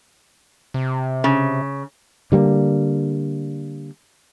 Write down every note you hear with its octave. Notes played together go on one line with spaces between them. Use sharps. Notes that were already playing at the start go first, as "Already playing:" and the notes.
C3
C#3
D3 G3 G#3 A#3